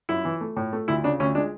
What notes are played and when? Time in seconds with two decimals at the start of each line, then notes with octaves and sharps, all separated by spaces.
0.09 F#2 E4
0.25 E3
0.41 A3
0.56 A2
0.73 A3
0.88 D2 E4
1.04 C#3 D4
1.20 D2 C#4
1.35 G#3 D4